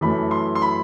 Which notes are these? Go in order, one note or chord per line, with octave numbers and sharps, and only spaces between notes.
F#2 E3 A3 B5
C6
C6
B5